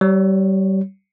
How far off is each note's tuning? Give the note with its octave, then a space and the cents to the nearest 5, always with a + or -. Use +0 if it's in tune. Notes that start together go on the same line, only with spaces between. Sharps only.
G3 -30 C#5 +0